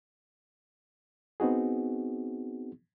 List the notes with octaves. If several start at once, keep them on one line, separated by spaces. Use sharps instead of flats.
B3 C4 D#4 F#4 G#4